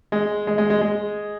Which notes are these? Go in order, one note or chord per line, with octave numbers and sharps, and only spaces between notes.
G#3
G#3
G#3
G#3
G#3